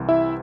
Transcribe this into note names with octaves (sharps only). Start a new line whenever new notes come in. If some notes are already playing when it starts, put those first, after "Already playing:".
Already playing: C2 C3 E3
E4 E5